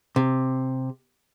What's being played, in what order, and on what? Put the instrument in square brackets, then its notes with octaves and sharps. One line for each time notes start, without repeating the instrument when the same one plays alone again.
[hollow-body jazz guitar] C3